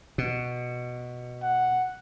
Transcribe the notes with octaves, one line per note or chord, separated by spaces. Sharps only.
B2
F#5